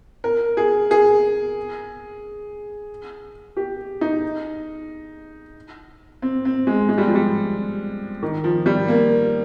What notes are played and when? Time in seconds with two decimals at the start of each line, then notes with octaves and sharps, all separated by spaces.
0.24 A#4
0.57 G#4
0.91 G#4
3.57 G4
4.01 D#4
6.22 C4
6.45 C4
6.67 G#3
6.89 G#3
6.98 G3
7.06 F3
7.15 G3
8.23 D#3
8.44 F3
8.66 G3
8.88 A#3